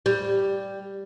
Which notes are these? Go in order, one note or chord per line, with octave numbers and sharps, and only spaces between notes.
G3